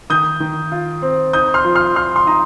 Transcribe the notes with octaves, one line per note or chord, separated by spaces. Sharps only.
D#3 D#6 G6
D#3
F4
C4
D#4 D#6 G6
C6 F6
F3
C6 F6
F3 C6 F6
C6
D#4 A#5 D#6